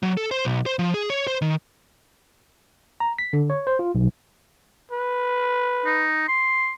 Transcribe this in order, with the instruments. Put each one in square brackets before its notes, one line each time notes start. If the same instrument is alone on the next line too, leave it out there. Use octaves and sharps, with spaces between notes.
[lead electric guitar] F#3
A4
C5
B1
C5
F3
G#4
C#5
C5
D#3
[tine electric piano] A#5
B6
D3
C#5
C5
F4
B1
[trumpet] B4
[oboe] D#4
C6